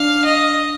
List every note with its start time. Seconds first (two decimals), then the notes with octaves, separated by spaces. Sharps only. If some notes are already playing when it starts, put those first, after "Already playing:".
Already playing: D4 F5
0.25 D#5